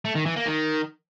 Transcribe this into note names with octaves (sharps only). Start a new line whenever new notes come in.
A3
D#3
E3
A#3
D#3